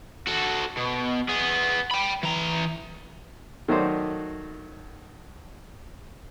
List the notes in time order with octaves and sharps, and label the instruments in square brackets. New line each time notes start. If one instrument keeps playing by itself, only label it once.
[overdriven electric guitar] F#4 A4
B2
B3 G#4
G5 B5
E3 A#5
[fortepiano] D#3 F#3 A3 D#4 C5 D5